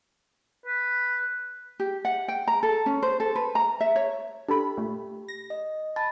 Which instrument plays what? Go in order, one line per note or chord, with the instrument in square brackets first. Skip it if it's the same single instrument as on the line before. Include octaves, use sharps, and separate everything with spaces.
[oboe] B4
[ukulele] G4
F#5
G5
A#5
A4
C#4
C5
A4
B4
A#5
E5
C#5
[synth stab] D4 A4 B5 [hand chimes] G4
[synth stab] A#2 A3
A#6
[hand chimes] D#5
A5 B5 A6